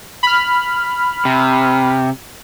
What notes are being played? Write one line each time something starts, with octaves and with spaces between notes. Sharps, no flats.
B5 F6
C3